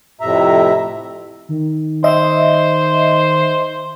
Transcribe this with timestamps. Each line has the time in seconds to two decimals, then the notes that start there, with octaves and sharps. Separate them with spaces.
0.21 F2 A2 C3 E5 A#5
1.49 D#3
2.04 C5 D#5 E5